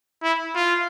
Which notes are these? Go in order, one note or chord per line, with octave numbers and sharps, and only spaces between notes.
E4
F4